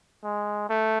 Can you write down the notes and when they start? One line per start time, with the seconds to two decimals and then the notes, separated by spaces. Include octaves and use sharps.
0.24 G#3
0.69 A3